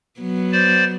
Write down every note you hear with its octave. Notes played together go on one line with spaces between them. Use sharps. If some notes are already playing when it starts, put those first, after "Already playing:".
F#3 B3
C5 D5